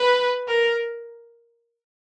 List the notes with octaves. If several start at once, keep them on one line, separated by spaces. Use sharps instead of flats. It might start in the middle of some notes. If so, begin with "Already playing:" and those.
Already playing: B4
A#4